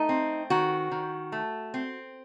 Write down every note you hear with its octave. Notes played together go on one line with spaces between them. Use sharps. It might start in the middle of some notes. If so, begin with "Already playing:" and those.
Already playing: A3 D#4
C4
D#3 F#4
D#3
A3
C4